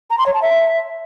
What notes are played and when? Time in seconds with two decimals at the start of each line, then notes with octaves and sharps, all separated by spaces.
0.10 A#5
0.18 C6
0.26 C#5
0.34 A5
0.42 E5